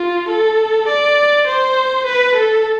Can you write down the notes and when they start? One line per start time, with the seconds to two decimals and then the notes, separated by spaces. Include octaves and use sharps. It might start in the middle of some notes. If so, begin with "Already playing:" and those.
Already playing: F4
0.29 A4
0.88 D5
1.47 C5
2.06 B4
2.35 A4